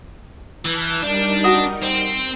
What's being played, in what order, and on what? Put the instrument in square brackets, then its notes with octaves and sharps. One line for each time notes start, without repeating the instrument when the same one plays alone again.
[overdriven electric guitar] E3 [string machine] A5 F6 G6
[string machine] G3 D#4 A#4 [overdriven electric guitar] D4
[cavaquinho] F#4 D#6
[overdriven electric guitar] C4